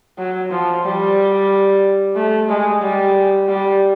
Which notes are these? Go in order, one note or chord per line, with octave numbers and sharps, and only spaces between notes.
F#3
F3
G3
A3
G#3
G3
G3